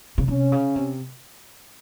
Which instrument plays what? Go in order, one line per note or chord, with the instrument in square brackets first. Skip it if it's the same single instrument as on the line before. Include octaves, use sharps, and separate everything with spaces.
[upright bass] C#3
[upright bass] C3 [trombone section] C#4
[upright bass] C#3
C3